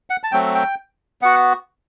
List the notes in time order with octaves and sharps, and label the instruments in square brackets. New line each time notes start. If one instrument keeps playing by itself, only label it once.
[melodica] F#5
A5
F#3 A3 C4 G5
G5
B3 F#4 F#5